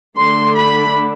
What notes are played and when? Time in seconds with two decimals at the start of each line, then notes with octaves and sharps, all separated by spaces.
0.17 D3 A3 D4 C6
0.56 B5